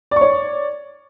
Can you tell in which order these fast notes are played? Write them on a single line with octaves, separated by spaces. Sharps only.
D5 C#6 C#5